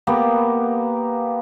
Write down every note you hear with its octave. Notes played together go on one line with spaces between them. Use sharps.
A#3 B3 G4